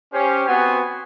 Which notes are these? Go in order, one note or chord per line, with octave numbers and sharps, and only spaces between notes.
C#4 G4 C5
B3 C4 F#4 C5 F#5 G#5